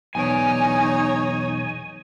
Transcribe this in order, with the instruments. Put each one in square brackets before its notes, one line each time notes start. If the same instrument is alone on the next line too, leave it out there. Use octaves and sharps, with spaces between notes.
[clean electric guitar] B1 E2 D5 [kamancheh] D#4 C#5 [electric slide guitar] G#5